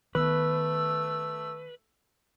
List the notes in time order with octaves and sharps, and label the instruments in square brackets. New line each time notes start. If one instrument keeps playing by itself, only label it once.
[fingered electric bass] D#3 B3 [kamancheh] A3 E6 [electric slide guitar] B4